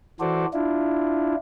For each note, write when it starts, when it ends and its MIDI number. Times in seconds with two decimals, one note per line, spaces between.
0.20 0.46 52
0.20 0.46 66
0.20 0.46 69
0.20 0.46 72
0.20 0.46 74
0.54 1.36 62
0.54 1.36 64
0.54 1.36 65